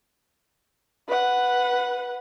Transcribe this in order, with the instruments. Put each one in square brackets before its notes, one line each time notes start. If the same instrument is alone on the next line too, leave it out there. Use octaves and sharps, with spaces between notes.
[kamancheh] B4 F#5